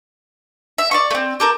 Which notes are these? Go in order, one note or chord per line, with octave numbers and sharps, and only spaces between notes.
E5
D5 E5 C#6
A3 C4
G4 A4 A#4